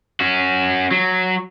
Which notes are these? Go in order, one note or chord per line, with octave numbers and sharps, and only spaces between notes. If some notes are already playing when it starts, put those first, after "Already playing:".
C#4 F#4
F#3